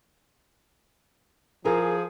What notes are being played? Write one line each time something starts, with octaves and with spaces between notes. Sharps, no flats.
F3 E4 G#4 A#4